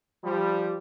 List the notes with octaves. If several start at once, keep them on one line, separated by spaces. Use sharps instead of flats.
F3 G3